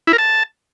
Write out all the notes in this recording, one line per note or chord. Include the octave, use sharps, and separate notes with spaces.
E4
A#4
A5